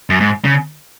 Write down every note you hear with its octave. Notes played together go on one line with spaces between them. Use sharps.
F#2
G#2
C#3